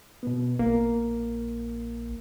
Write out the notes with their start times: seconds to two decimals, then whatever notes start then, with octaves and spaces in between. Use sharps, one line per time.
0.23 B2 B3
0.59 A#1 A#3